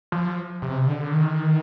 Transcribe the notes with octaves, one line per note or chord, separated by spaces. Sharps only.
F3
C3
D3
D#3